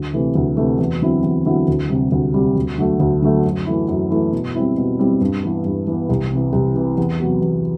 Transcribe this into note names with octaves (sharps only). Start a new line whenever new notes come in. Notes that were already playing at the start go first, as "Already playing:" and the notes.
Already playing: D2
C3 E3 A3
D2
C3 E3 A3
E2
D3 F#3 C4 E4
E2
D3 F#3 C4 E4
D2
C3 G3
D2
C3 G3
D2
D3 F#3 A3
D2
D3 F#3 A3
F#2
E3 A3 E4
F#2
E3 A3 E4
B2
G3 C4 E4
B2
G3 C4 E4
G2
E3 B3
G2
E3 B3
C2
C3 E3
C2
C3 E3
E2
C3 F#3 B3
E2